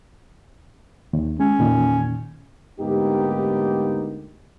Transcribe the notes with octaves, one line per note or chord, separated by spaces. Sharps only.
D#2
G#3 C#4
E2 A#2 D#3
D2 G#2 A#3 B3 D#4 G4